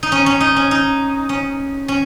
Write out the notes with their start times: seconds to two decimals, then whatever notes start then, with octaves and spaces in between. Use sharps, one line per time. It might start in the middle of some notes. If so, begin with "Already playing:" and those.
0.03 D#4
0.12 C#4
0.26 C#4
0.41 D#4
0.56 C#4
0.71 D#4
1.29 C#4
1.88 C#4